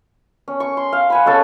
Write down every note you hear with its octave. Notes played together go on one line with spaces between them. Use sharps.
C#4
C#6
C6
F5
F#5 G#5 B5
G#3 C#4 A4